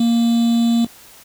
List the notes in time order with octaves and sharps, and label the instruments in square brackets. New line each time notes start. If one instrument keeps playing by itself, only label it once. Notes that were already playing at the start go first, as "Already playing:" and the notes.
Already playing: [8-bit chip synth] A#3